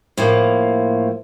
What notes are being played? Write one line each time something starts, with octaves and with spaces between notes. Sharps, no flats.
A2 F3 A#3